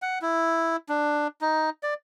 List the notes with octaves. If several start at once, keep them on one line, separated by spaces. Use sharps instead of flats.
F#5
E4
D4
D#4
D5